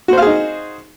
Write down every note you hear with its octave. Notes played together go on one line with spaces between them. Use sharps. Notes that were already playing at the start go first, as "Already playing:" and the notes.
D#4 F#4 G#4 C5 F5